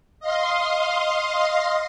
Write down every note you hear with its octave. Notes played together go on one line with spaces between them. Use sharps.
D#5 F5 C6